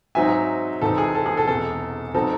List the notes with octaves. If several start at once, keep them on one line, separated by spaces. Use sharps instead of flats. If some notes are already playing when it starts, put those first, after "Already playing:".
G#2 F#3 C4 D#4 E5 G#5
C2 C3 E3 C4 D#4 A4
G#4
A4
G#4
A4
E1 E2 C3 A4
C3 F#3 C4 D#4 A4